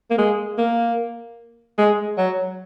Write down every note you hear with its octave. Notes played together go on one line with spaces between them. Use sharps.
A#3
G#3
A#3
G#3
F#3